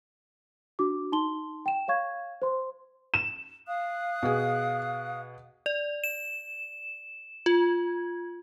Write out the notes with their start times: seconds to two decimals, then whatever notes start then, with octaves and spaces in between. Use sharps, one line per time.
0.79 D4 F#4 D6
1.12 D#4 A5 C6 G7
1.66 G5 E7
1.88 C#5 F5 C#6 G#6
2.42 C5 C6
3.14 E7
3.67 F5 D#6 F#6
4.23 B2 G#4
5.66 D5
6.04 E7
7.46 F4